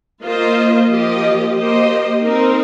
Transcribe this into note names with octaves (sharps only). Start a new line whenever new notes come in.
A#3 F4 C5 D#5
F3 A#3 G4 D#5
A#3 G4 C5 D#5
C4 D#4 A#4